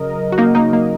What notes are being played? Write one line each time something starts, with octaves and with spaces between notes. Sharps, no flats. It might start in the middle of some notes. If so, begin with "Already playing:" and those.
Already playing: C#3 F#3 A#4 D#5
F#4
A#3 D#4
A#3 D#4
A#3